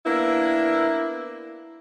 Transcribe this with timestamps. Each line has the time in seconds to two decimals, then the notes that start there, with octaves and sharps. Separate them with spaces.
0.06 A#3 B3 D4 E4